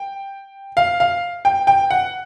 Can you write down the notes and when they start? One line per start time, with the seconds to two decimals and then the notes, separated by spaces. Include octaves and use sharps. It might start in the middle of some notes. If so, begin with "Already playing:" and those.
Already playing: G5
0.77 F5
1.00 F5
1.45 G5
1.67 G5
1.91 F#5